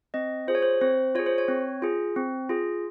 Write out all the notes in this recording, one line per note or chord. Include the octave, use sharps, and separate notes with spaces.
C4 D#5
F4 G#4 C5
C#5
C5
C4 C5
F4 G#4 C#5
C5
C#5
C4
F4 G#4
C4
F4 G#4